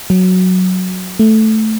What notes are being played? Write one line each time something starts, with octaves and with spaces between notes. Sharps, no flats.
F#3
A3